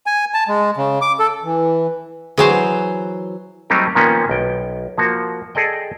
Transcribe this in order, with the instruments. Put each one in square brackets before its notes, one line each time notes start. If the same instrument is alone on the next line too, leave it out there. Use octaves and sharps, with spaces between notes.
[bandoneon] G#5
A5
G#3
C#3
D6
A4
[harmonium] E3
[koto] E3 F#3 C5 [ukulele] G#4 G#5
[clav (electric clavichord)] F#3 G3 A3 C4 D#4 G4
A#2 D#3 F3 A#3 B3 C#4
B1 G5
F3 A#3 F#4
G#4 A4 D5 D#5 G5